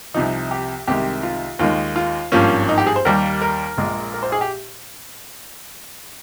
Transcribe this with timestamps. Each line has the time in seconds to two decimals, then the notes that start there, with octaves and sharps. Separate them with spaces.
0.14 C2 C3 F3 D#4
0.51 G4
0.87 C2 C3 D#3 G#3 G4
1.23 F4
1.59 D#2 D#3 G#3 F4
1.96 F4
2.32 G#1 G2 F3 A#3 C#4
2.69 D#4
2.78 G4
2.87 G#4
2.96 C5
3.05 D#2 D#3 G3 A#3 A#4
3.41 A#4
3.78 A#1 A#2 G#3
4.14 A#4
4.23 C5
4.32 G#4
4.41 G4